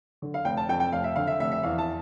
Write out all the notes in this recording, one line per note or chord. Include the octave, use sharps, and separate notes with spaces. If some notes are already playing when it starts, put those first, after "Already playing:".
D3
F5
F1 G5
A5
F2 G5
G5
F1 F5
E5
D3 F5
E5
F1 E5
E5
E2 F5
A5